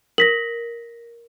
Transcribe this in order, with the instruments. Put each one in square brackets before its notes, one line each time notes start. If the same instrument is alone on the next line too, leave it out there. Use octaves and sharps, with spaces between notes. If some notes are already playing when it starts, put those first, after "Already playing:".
[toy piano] A#4 [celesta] A#6 B6 F#7